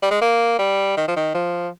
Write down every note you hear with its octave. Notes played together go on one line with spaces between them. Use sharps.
G3
G#3
A#3
G3
D#3
F3
D#3
F3